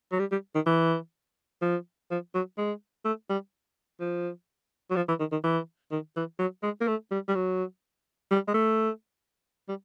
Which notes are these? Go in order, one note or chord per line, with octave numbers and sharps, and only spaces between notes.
F#3
G3
G3
D#3
E3
F3
F3
F#3
G#3
A3
G3
F3
F#3
F3
E3
D#3
D#3
E3
D#3
E3
F#3
G#3
A#3
A3
G3
G3
F#3
G3
G#3
A3
G3